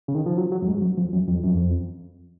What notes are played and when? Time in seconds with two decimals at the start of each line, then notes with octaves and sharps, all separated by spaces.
0.08 C#3
0.15 D#3
0.26 F3
0.37 F#3
0.52 F#3
0.62 F#2
0.67 G#2
0.82 F#2
0.97 F2
1.13 F#2
1.28 F2
1.44 F#2
1.50 F2